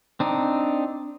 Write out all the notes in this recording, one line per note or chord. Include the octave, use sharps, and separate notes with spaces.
C4 D4 D#4